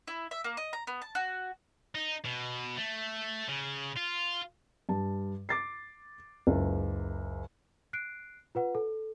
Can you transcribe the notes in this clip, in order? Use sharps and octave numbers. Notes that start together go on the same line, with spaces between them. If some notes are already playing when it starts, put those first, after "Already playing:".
E4
E5
A#3
D#5
A#5
B3
A5
F#4
D#4
B2
A3
C#3
F4
G2 A5
D6 A6 C7
F#1 C#2
F#6 C7 D7
F4 B4 F#5
A4